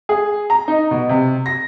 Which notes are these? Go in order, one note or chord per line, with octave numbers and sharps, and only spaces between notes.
G#4
A#5
D#4
B2
C3
A#6